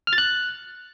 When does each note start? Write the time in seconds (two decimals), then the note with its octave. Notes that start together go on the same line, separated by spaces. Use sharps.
0.07 F6
0.13 A6
0.18 F#6